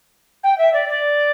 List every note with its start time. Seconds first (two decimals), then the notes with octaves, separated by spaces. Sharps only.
0.43 G5
0.58 E5
0.73 D5
0.89 D5